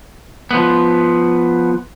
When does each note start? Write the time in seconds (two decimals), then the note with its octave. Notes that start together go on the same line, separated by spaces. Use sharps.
0.51 F3 B3